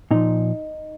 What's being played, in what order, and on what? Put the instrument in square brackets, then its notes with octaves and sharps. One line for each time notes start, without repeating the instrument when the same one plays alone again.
[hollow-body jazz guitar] A#2 F3 D#4